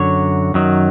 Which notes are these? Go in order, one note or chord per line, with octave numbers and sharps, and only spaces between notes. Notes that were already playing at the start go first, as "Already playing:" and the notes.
Already playing: F#2 D3 F#3 C#5
F#2 D#3 F#3